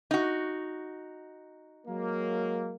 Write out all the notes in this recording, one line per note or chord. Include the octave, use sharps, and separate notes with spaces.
D#4 F#4
F#3 G#3 A#3